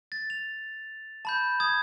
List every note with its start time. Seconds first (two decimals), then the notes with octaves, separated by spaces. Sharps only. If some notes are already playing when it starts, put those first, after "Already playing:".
0.12 A6
0.30 F7
1.25 A5 B5 G6
1.60 D#6 G#6